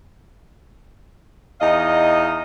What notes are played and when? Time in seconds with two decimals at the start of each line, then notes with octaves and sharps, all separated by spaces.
1.60 E2 D#4 D#5 F5